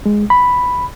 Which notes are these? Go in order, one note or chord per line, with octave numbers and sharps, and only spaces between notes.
G#3
B5